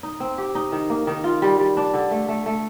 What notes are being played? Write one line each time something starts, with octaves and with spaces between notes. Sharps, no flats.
D#4
C4
G4
D#4
D#3
A#3
D#3
F4
G3
G3
D4
D3
A3
A3
A3